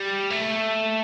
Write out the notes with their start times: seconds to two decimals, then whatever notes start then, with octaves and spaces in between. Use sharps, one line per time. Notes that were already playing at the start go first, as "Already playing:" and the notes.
Already playing: G3
0.30 A3